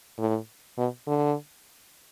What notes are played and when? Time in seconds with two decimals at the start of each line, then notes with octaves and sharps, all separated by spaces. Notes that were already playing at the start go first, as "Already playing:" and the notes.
0.19 A2
0.78 B2
1.07 D3